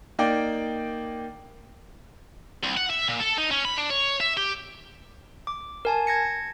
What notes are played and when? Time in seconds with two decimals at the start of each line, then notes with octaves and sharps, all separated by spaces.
0.19 A#3 D#4 D5 G5
2.64 C2
2.77 F#5
2.90 E5
3.08 A#2
3.20 A4
3.38 D#4
3.51 C#4
3.65 B5
3.77 D4
3.90 C#5
4.20 E5
4.37 G4
5.47 D6
5.85 A#4 G#5 A5
6.07 G#6 A#6 C#7